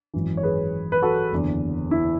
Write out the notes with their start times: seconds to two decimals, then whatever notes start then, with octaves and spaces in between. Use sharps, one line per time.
0.14 G#1 F#2 E3
0.37 C#5
0.43 G#4 B4
0.92 B4
1.02 F#4 A4
1.32 F#1 E2 D3
1.91 E4